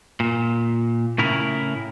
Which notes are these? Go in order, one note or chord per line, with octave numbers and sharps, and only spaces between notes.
A#2
A2 C#3 E4 A#4